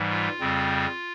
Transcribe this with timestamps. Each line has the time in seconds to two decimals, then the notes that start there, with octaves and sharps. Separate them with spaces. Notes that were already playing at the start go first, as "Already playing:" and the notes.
Already playing: G#2 E3 G3
0.11 F4
0.40 F2 C#3 G3 C4